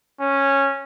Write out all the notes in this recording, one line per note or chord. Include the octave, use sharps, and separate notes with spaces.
C#4